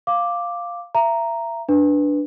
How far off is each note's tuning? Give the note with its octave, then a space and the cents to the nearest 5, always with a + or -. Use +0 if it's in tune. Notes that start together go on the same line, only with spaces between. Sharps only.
F5 +0 D6 +0
E5 +30 A#5 +0
D4 +0 B4 +0